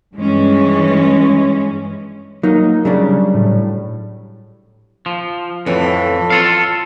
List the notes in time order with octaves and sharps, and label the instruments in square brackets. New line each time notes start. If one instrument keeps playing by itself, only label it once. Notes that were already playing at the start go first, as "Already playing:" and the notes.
[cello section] G2 E3 G#3 C#4
[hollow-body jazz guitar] F#3 A#3 [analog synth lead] D#4
[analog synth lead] C#3 [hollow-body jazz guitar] F#3 G3 D4
[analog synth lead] A2
[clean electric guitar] F3
[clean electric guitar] F2 [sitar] A2 E3
[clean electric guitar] F4 A4 F5